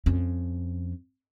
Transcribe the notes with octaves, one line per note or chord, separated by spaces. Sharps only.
F2 C#4